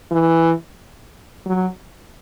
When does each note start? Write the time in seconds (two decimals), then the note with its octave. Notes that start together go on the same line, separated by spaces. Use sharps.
0.11 E3
1.46 F#3